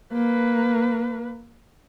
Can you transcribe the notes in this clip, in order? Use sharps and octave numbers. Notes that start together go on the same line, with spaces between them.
A#3 B4